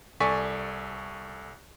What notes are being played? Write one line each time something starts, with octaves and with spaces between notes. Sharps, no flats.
C2 A4 D5 G#5 C#6 B6